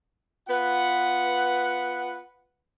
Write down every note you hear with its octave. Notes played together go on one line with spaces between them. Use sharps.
B3 F4 B4 F#5